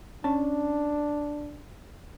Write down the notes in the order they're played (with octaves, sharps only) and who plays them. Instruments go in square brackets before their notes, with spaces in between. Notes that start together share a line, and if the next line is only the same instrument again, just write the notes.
[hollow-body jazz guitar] C#4 A5 [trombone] D4